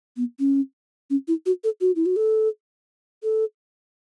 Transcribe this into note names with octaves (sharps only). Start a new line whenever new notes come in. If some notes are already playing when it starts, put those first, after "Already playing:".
B3
C#4
C#4
E4
F#4
A4
F#4
E4
F#4
A4
A4